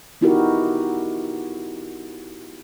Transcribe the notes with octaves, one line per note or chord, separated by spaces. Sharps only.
B3 D#4 E4 F#4 G4 A#4